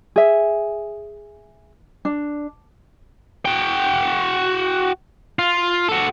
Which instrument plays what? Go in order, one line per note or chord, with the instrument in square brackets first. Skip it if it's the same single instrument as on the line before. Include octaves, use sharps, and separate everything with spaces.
[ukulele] G#4 E5
D4
[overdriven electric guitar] F#4 G5
F4
F#4 A4